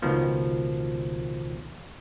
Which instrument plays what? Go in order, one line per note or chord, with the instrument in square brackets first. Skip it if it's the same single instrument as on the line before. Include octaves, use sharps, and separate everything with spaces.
[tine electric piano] C#2 B2 D#3 F3